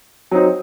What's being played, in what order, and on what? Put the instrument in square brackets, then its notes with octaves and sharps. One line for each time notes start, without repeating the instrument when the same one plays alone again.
[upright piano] F#3 C4 D#4